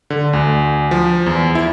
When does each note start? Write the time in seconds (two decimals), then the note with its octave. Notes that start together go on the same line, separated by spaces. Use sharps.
0.10 D3
0.33 D2
0.91 F3
1.26 E2
1.55 E4